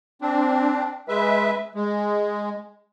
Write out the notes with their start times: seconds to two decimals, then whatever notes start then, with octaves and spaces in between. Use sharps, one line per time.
0.21 C4 D4
1.08 G#3 B4 E5
1.75 G#3